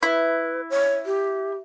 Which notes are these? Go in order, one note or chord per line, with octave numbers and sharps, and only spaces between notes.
E4 B4
C#5
G4